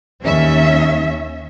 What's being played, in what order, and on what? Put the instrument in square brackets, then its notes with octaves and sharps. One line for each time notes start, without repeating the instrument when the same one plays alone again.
[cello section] D#2 C#4 E5